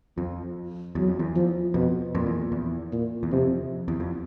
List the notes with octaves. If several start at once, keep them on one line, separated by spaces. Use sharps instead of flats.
F2 F3
E2 F#3
F2
E2
F3
F2 B2
F2 A#2
E2
E2
A#2
E2
F2 C3
E2
F2